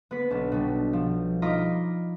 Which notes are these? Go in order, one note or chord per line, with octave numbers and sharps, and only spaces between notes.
B3 B4
B1 D4
B2 G3
F3
D#4 F4 D#5 A#5 B5 D6